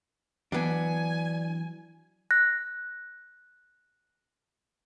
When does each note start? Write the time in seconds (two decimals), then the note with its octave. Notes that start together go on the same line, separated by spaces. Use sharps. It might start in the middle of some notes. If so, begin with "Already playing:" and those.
0.52 E3 F#3 B3 D4 G#5
2.31 F#6 A#6